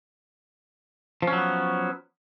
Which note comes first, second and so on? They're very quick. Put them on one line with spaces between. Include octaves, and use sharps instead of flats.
F3 C#4 F#3 B3